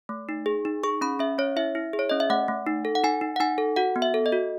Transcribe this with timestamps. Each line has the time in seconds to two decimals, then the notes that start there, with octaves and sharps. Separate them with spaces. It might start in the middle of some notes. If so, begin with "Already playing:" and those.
0.09 A3
0.29 D#4
0.46 G#4
0.65 D#4
0.83 G#4 C#6
1.01 C#4 B5
1.19 C#4 E5
1.38 C#4 C#5
1.56 E4 E5
1.75 E4
1.93 G#4
1.99 C#5
2.10 C#4 D#5
2.20 E5
2.30 A3 F#5
2.48 A3
2.66 D#4
2.85 A4
2.95 F#5
3.04 D#4 G#5
3.21 D#4
3.36 F#5
3.40 D#4 G#5
3.58 A4
3.76 F#4 F#5
3.96 B3
4.02 E5
4.14 A4
4.26 D#5
4.32 F#4